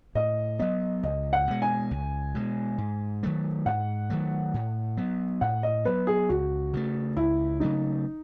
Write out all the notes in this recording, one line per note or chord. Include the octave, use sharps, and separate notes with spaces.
A2 D#5
F#3 B3 D#5
C#2 D#5
F#5
B2 G#3
G#5
C#2
B2 G#3
G#2
D#3 F#3 A3
G#2 F#5
D#3 F#3 A3
A2
F#3 B3
A2 F#5
D#5
F#3 B3 B4
G#4
C#2 F#4
C#3 F#3 A3
C#2 E4
C#3 F#3 A3 D#4